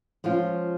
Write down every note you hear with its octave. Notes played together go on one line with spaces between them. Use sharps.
F3 G#3 C#4 F4